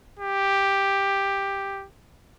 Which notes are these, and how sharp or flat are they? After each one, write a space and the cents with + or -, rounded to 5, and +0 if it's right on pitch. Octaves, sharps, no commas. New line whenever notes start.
G4 +5